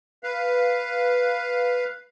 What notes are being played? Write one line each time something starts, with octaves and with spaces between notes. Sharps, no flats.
B4 F5